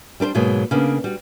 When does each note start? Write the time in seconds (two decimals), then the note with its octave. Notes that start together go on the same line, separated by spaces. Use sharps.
0.20 G3 D4 B4 C5
0.35 G#2 B2 F#3 G#3 A#3
0.71 C#3 A#3 B3 D4
1.04 G3 F#4